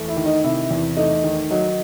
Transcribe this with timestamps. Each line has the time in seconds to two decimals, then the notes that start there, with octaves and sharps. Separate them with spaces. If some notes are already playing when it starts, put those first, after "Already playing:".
Already playing: E2 A3
0.08 E4
0.17 D#3
0.26 D#4
0.44 C3 E4
0.71 E2
0.97 A3 D#4
1.24 D#3
1.51 F#3 D#4